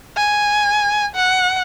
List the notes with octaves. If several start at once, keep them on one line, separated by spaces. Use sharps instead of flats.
G#5
F#5